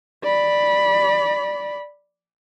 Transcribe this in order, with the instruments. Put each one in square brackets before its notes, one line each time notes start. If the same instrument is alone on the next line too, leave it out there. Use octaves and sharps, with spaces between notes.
[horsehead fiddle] D5 B5